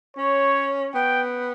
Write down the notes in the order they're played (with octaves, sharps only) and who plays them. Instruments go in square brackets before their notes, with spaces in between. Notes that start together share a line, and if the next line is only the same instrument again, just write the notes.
[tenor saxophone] C#4 [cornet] C#5
[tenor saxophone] B3 [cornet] G5